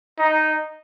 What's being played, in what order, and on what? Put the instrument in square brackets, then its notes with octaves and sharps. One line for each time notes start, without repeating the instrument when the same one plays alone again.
[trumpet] D#4